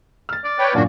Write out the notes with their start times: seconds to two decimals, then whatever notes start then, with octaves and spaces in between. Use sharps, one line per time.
0.29 F6 A6
0.44 D5
0.59 B4 C#5 G5
0.74 F#2 A#2 A#3 D4 F#4